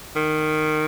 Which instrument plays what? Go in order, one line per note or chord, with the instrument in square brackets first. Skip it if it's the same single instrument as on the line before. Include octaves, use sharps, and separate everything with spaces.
[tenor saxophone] D#3